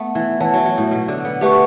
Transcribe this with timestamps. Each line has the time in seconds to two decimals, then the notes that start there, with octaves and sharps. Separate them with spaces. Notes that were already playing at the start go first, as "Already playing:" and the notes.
Already playing: A3 B3
0.15 E3
0.40 E3 C#5 F#5 A5
0.54 F#3
0.66 F#3
0.78 A2
0.91 B2
1.08 D3
1.25 B3
1.41 A3 G4 B4 F#5 C#6